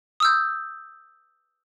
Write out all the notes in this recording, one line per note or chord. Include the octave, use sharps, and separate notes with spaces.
D#6 E6 G6